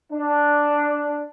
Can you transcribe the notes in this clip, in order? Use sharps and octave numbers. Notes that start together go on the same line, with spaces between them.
D4